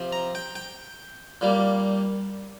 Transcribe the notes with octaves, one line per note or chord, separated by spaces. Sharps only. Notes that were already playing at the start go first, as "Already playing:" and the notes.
Already playing: C3 F3 C4
A#5
G5
G5
A#2 G3 A#3